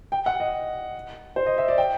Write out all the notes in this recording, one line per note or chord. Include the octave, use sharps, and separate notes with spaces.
G5
F#5
D#5
C5
D#5
E5
D5
G5